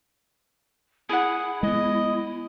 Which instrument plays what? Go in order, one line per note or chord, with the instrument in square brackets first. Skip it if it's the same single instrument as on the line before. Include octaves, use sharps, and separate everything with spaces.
[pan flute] E4 [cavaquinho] G#4 F#5
[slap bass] G#3 B3 [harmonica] D#5